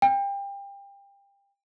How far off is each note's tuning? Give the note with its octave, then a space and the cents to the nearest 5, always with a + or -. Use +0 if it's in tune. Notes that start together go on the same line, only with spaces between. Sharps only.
G5 +25